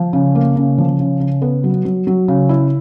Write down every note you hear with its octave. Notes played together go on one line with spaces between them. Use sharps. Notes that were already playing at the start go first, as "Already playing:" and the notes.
Already playing: F3
C#3
A#3
C#3
F3
C#3
C#3
B3
F#3
F#3
F#3
C#3
E4